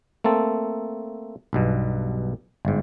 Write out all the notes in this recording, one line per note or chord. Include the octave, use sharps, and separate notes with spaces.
A3 A#3 C4 A4
B1 G2 B2
G1 G#2